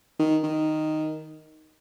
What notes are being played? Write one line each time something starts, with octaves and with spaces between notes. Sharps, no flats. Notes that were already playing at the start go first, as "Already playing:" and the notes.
D#3
D#3